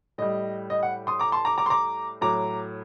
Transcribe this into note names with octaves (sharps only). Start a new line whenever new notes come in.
A2 G3 D#5
D#5
F#5
C6 D#6
A#5 D6
A5 C6
A#5 D6
A#5 D6
C6
A#5 D6
A2 F#3 A#5 D6